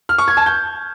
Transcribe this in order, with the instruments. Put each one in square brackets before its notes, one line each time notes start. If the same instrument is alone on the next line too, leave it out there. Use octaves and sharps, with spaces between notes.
[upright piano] F6
C#6
G#6
A5
G6